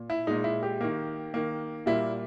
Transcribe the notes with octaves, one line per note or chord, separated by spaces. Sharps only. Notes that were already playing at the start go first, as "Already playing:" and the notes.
Already playing: A#2
E4
A#2 G#3 D#4
E4
G4
D#3 A#3
D#3 A#3
A#2 G3 A#3 E4